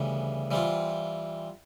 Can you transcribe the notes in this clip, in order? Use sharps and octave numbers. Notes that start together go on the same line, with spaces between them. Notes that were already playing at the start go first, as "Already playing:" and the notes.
Already playing: D2 C#3 E3 G3 B3
E3 G3 C4 F4